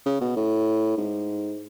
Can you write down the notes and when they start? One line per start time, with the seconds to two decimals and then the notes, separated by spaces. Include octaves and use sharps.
0.06 C#3
0.21 B2
0.36 A2
0.97 G#2